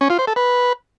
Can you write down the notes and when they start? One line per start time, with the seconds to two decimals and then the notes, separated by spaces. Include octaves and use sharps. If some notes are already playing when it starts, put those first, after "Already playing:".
0.01 C#4
0.10 F4
0.19 C5
0.27 A4
0.36 B4